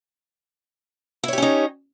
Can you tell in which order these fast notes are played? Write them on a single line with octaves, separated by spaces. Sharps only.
E4 C#5 G4 C#4 D#4